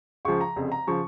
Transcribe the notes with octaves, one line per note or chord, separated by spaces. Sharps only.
C#2 C#3 F3 C#6
A#5
F1 F2 C#3
A#5
C#3 F3 C#6